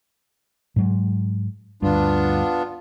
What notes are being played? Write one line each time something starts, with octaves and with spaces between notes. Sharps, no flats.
G#2 F#3 G#3
D2 G2 B3 D4 F4